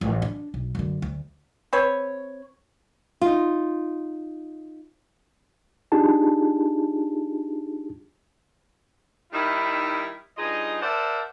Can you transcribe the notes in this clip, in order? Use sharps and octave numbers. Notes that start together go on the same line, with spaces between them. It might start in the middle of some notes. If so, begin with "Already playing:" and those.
A1
D4
B1
F#2 D3
D2
C4 B4 C#5
D#4 F4
D4 D#4 F4 G4 G#4 A5
D#3 G3 D#4 E4
G2 D#4 F4 G#4 D#5
A#4 C5 D5 E5 F#5 A5